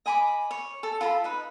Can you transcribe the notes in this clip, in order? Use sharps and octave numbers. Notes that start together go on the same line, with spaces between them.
D#5 G#5 B5 D6
C#5
A4
F4 A4 A#5 B5
D#4 B4